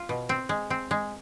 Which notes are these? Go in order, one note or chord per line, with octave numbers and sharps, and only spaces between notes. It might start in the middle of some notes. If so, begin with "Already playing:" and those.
Already playing: F4
B2
C4
G#3
C4
G#3